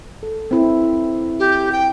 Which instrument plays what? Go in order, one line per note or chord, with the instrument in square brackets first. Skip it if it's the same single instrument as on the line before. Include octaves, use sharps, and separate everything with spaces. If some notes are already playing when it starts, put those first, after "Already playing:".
[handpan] A4
C4 E4
[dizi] G4
G5